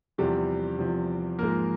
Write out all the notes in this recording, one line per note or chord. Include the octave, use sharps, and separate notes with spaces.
E2 C3 F3 G3 G4
E2 C3 F3
G#2 F3 G#3 A#3 A#4